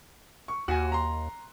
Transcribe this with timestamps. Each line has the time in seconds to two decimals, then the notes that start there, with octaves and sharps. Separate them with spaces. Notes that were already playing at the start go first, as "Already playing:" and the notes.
0.48 C#6
0.68 D#2 F#4 G#5
0.92 A#5 C6